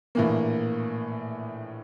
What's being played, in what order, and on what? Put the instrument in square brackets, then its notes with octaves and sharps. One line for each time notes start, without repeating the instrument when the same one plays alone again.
[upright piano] A#1 A2 E3 A#3